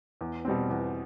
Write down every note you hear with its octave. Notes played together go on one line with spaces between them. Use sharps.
E2
B2 G3 C4
E2